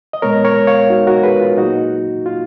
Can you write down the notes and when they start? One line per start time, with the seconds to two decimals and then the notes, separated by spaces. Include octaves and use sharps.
0.13 D#5
0.22 A#2 G#3 B3 A#4 C#5
0.45 A#4 C#5
0.67 C#5 F5
0.90 D#4 F#4
1.07 F#4 A#4
1.23 G#4 B4
1.41 F4
1.58 A#2 F#3 A#3 D#4 F#4
2.26 F4